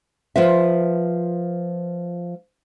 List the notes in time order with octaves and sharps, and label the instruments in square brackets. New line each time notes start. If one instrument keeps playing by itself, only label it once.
[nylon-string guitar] F3 F4 B4 E5